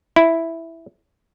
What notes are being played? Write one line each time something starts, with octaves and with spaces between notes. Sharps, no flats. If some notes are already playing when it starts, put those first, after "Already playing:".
E4